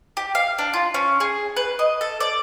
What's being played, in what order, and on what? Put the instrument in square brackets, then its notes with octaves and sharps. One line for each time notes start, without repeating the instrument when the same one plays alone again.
[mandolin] G4
F5
D4
F4
C#4
G#4
B4
D#5
A4
D5